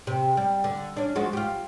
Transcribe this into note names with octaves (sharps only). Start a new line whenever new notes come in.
C3
G3
D3
C#4 D4
F3 G#3 F#4
F4 G4